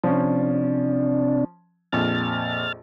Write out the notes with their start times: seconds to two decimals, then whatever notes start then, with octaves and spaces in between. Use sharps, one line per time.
0.04 C3 F3 C#4 D4
1.92 A#1 F2 F6 A6